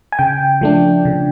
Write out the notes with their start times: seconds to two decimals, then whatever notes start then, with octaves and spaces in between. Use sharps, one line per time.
0.12 G#5
0.19 C#3 G5
0.61 F3 A3 D4
1.05 C#3